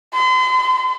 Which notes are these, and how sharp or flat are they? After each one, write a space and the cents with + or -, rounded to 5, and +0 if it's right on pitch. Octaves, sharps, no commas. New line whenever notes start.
C6 -40